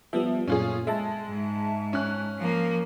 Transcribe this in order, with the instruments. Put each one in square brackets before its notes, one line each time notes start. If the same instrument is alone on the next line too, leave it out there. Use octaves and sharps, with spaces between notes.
[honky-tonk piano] F3 [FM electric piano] G3 B3 E5
[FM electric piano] F#2 A#2 [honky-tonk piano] C#4 F4 G#4
[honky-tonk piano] G#3 [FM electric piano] E5 A5
[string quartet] G#2
[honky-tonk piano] C#4 F#6
[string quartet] F3 A#3